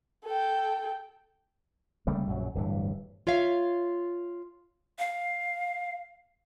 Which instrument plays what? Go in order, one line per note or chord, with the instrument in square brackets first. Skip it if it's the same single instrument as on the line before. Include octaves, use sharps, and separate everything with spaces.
[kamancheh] A4 G5
[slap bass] C#3 G3 A3 A#3
A#1 F#2 F#3
D1 G2 E3
[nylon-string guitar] F4 C#5 E5 F5
[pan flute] F5